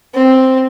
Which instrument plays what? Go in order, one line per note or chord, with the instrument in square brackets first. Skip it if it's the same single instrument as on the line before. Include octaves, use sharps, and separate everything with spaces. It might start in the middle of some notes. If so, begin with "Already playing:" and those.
[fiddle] C4